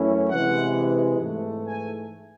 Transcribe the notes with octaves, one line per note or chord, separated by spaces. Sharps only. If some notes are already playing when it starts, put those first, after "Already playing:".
Already playing: F#2 E3 A3 C#4 E4
C3 E3 G#3 F#5
G#2 E3 A3
G#5